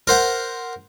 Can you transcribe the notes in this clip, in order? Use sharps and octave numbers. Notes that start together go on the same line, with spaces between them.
A#4 C5 F#5